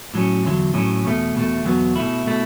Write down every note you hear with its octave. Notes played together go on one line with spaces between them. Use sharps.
A2 F#3 C#4
E2 D3 F#3
A2 F#3 C#4
E2 B2 A3
E2 B2 A3
E2 B2 F#3 B3
B2 A3 E4
B2 A3 E4